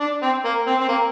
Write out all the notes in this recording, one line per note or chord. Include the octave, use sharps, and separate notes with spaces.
D4
C4
A#3
C4
C4
A#3